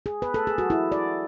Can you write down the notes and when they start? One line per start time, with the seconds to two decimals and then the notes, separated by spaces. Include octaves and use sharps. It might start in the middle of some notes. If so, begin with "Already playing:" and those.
0.06 G#4
0.22 B4
0.34 A4
0.47 G#4
0.58 F#4
0.70 E4
0.92 D5